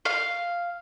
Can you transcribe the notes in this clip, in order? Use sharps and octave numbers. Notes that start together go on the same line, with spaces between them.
F5